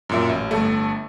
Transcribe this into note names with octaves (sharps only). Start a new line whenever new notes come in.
F#2 A#2 E5
A1
G1 A3